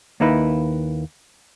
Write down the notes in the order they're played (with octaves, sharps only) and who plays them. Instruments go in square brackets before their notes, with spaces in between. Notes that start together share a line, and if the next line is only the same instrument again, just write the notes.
[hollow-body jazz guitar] D#2 A#3 D#4 E4 B4